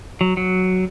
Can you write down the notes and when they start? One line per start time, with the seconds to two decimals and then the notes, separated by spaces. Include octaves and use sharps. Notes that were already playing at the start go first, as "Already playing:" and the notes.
0.21 F#3
0.37 F#3